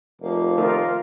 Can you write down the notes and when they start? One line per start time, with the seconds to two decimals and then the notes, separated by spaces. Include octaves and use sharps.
0.21 F1 F3 A#3
0.58 D#3 A3 F4 A#4